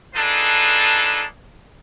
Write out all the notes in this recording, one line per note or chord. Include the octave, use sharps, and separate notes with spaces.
D4 D#4 F4 G#4 A4 B4